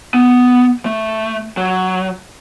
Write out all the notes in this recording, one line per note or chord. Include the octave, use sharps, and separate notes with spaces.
B3
A3
F#3